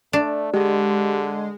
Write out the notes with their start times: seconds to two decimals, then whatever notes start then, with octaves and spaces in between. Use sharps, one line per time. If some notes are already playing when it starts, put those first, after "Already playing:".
0.13 A3 D4
0.54 D3 G#3 G4